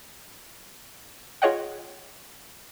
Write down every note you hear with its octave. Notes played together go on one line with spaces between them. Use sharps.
F4 G#4 C#5 D#5 F#5 G5